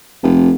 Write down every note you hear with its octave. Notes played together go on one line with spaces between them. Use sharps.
F1